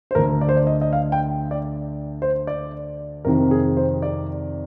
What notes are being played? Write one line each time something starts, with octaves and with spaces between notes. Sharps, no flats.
C5
D2 D3 A#4
D5
C5
D5
D#5
D#5
F5
G5
D5
C5
D5
F2 C3 D#3 A#4
G#4
C5
D5